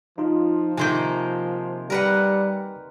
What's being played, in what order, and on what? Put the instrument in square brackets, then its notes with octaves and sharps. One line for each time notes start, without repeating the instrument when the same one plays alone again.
[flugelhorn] F3 [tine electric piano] D#4 F4
[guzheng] C3 D#3 A#3 [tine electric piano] G#5 C6 G6
[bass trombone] G3 [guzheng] A#4 B4 F#5